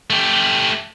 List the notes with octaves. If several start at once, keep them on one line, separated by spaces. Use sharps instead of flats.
A3 G4